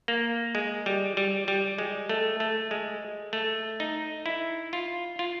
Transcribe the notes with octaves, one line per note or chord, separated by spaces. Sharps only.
A#3
G#3
G3
G3
G3
G#3
A3
A3
G#3
A3
D#4
E4
F4
F4